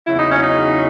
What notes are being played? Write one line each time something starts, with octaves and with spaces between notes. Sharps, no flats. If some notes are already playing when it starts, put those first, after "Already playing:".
E2 C#3 F#3 E4
D#4
C#4
D#4